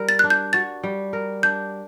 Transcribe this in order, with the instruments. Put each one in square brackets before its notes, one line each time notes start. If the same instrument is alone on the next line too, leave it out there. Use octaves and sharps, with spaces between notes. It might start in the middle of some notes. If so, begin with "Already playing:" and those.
Already playing: [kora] G3 A#4
[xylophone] A6
[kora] D4 [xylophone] F#6
[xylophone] G6
[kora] F#4 [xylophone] A6
[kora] G3
A#4
[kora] D4 [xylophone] G6